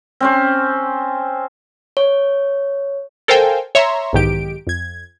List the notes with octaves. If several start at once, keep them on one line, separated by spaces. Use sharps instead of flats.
C4 C#4 C5
C#5
A4 A#4 C5 F5 G5 G#5
C#5 E5 A#5 C6
B1 E2 G#2 D#3 G4 D7
F2 G#6